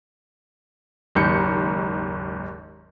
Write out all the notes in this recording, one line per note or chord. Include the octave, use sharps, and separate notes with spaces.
F#1 D#2 G#2 G6 C#7